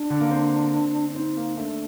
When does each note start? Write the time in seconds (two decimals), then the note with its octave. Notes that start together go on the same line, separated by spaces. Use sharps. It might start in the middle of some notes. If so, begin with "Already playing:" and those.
Already playing: D4
0.10 D3
0.20 A#3
0.31 C4
1.10 D4
1.15 C4 D#4
1.37 A#3
1.57 A3 D4